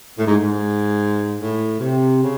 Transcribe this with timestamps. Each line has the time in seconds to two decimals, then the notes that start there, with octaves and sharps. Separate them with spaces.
0.18 A2
0.26 G#2
0.43 G#2
1.40 A2
1.81 C3
2.22 C#3